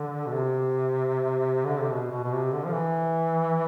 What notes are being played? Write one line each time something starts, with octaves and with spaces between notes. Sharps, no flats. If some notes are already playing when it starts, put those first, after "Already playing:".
Already playing: D3
B2
C3
D3
C3
B2
B2
B2
C3
D3
F3
E3